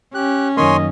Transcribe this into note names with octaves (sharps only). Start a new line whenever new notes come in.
C#4 G4 F#6
F#2 D#3 A#3 C#5 D#5 G#5 C6